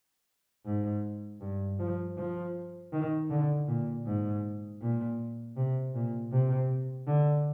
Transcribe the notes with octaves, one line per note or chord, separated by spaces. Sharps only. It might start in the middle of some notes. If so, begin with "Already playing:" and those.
G#2
G2
F3
F3
D#3
D3
A#2
G#2
A#2
C3
A#2
C3
D3